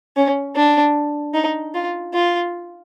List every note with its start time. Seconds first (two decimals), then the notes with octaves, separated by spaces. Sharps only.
0.17 C#4
0.56 D4
1.34 D#4
1.74 F4
2.14 F4